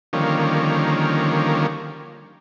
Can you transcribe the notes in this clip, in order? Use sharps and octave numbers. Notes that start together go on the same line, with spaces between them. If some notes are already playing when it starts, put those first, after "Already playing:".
D3 D#3 F3 G3 A#3 C#4